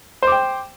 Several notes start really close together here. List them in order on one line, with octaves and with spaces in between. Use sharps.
C5 D6 G5